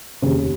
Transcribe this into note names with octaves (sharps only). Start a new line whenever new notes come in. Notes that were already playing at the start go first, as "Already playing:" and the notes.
F1 D#2 C#3